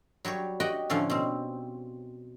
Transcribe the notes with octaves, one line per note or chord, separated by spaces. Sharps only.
F#3 G3 G4 C#5
F#4 G4 D#5 F#5 G5
A2 D3 F3 C#4 F5
B2 C4